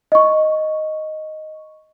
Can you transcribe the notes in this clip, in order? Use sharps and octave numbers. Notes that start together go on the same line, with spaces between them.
D#5 C#6